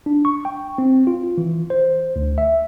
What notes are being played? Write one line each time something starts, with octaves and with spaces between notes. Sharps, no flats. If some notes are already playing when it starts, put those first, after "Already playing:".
D4
C#6
G5
C4
F4
E3
C5
D2
E5